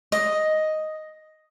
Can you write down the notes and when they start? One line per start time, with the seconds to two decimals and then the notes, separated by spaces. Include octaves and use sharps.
0.12 D#5